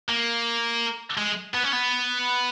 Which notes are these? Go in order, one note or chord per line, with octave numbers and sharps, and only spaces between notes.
A#3
G#3
B3
C#4
B3